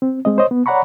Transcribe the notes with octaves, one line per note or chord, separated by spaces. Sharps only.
C4
G#3 C4 D#5
C5 C#5 D#5
B3
C#5 D5 F#5 A#5 B5 C#6